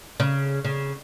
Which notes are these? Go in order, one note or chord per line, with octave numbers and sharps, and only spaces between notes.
C#3
C#3